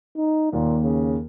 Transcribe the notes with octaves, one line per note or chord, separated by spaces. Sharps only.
D#4
D#2 A#2
C#3